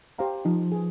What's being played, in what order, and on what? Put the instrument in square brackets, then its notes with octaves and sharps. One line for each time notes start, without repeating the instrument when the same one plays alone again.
[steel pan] G4 C5 F5 A#5
[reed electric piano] F3 [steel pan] D#4
[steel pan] G#4 B4